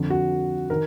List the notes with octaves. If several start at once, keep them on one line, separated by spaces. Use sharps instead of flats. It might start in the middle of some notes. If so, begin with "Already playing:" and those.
Already playing: F2 D3
F#4
D#3 A#4